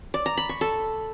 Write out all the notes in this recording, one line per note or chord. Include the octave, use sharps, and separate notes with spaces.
D5
A#5
B5
C#6
A4